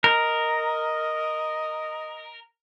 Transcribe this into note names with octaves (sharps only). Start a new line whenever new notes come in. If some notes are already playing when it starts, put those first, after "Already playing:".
A#4 D#5